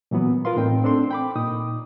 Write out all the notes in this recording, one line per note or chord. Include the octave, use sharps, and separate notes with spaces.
A#2 E3 F#3 B3
F4 A#4 B4 F5 C6
A2 C4 D#4 G5
C4 D4 A4 C6
G5 B5 D6
A#2 D#4 D#6